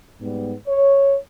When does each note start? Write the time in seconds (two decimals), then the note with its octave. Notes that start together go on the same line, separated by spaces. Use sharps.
0.21 G#2 G3 B3
0.67 C#5